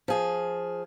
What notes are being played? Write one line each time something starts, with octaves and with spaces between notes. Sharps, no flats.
F3 G#4